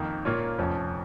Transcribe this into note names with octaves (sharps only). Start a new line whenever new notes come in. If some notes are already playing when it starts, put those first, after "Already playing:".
Already playing: F2 D#3 A#3
A#2 A#3 F4 C#5
F1 F2 F3 C#4